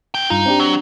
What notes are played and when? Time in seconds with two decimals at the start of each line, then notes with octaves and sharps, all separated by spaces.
0.14 B3 G5
0.30 G2 D#4 F4
0.46 C4 D4 G4
0.60 F#3